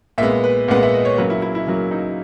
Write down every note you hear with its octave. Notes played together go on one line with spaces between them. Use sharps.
A#2 G#3 B3 E5
B4
A#2 G#3 B3 F#5
E5
D#5
C#5
C#3 F#3 A#3 B4
E4
E4
E4
C#3 F#3 A#3
D#4